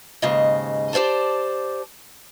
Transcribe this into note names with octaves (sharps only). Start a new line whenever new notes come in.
D#2 G#2 C#3 D#5
G4 A#4 C5 D5 A5